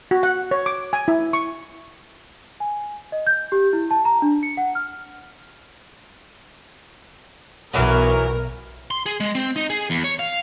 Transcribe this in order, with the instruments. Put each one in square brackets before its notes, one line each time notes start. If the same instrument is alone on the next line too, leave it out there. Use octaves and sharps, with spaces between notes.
[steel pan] F#4
F#5
C#5
D6
G#5
E4
C#6
[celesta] G#5
D#5
G6
G4
E4
A5
A#5
D4
C#7
F#5
F6
[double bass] B1 [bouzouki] E3 F#3 B3 [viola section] A#4
[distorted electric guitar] C6
G#4
G#3
C4
D#4
G#4
E2
C#5
F5